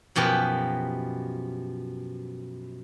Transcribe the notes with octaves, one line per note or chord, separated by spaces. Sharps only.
F#2 B2 F3 G4 B4